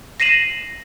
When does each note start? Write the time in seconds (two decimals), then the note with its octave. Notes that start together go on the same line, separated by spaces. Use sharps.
0.20 A#6 C7 D#7 E7 F#7